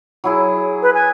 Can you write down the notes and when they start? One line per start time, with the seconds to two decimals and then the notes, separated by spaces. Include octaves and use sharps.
0.24 F#3 E4 G#4
0.82 B4
0.94 G#5